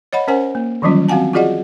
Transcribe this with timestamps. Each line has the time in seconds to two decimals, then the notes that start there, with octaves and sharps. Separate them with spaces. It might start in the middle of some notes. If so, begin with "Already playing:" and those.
0.13 C#5 D#5 F#5 B5
0.28 C#4 A#4 C5 F#5 G#5
0.55 A#3
0.82 D#3 E3 F#3 G3 C#4 F4
1.08 C4 F#4 F5 F#5 G#5 A5
1.33 F4 F#4 G#4 D5 D#5 F#5